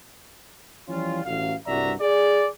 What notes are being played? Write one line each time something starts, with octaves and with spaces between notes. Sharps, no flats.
E3 F3 G3 C#4 F4
A1 F#3 F5
C2 G2 F#4 D5 E5 A#5
G#4 D5